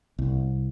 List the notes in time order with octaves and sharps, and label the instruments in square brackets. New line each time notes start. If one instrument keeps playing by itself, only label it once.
[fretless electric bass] C2